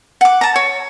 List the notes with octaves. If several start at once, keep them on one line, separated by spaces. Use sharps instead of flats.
F#5 D6
A5 A#5
C#5